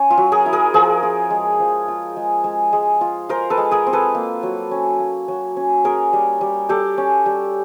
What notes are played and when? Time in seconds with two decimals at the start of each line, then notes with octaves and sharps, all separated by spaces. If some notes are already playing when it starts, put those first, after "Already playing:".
Already playing: C#4
0.10 F4
0.17 F#3
0.32 G#4 A#4
0.46 E4
0.53 G#4 A#4
0.74 F3 G#4 A#4
1.03 F4
1.30 G#3
1.60 F3
1.88 F4
2.17 G#3
2.44 G#3
2.73 G#3
3.01 F4
3.29 F4 A#4 C5
3.50 A4 B4
3.57 G#3
3.71 G#4 A#4
3.87 C4
3.93 A4 B4
4.15 A#3
4.43 F#3
4.71 C#4
5.00 A#3
5.28 F#3
5.57 C#4
5.84 C#4 G#4 A#4
6.13 G3
6.41 G3
6.69 G3 G4 A4
6.98 C#4
7.26 G3